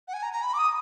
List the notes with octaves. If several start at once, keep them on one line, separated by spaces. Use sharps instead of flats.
F#5
G#5
A#5
A#5
B5
D6
D#6